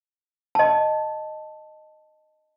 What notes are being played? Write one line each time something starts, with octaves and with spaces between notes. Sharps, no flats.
D#5 A5